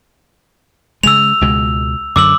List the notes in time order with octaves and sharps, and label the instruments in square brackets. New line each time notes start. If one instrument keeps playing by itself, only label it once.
[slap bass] C#3 G#3 [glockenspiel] E6 F7
[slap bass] C#2 B2 G#3
[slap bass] F#2 D3 [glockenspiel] D6 E6 F#7